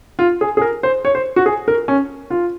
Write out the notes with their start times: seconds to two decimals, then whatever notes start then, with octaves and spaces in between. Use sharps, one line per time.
0.19 F4
0.41 G#4
0.57 G#4
0.61 A#4
0.83 C5
1.05 C#5
1.15 C5
1.36 F#4
1.46 G#4
1.68 A#4
1.88 C#4
2.30 F4